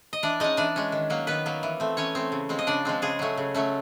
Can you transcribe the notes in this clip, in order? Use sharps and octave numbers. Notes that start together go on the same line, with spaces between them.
D#5
E3 D4 D5
G#3 C#4 D#4 D#5
E3 D4 D5
G#3 C#4
D#3
F#3 A#3
D#3 B3 B4
F#3 A#3
E3
A3 C4
E3 C#4 C#5
A3 C4
C#3
F3 G#3 C4
D#5
C#3 D4 D5
F3 G#3 C4
C#3 G#3 G#4
F#3 A3 C#4
C#3
F#3 A3 C#4